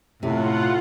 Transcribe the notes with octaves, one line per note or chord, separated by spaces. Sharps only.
A2 C3 F4 F#5